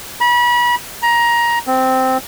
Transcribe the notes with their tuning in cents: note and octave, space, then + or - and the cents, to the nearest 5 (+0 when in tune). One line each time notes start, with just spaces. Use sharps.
B5 -35
A#5 +20
C4 -10